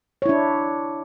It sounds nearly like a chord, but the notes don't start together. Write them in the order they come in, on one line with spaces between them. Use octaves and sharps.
C#5 E4 D4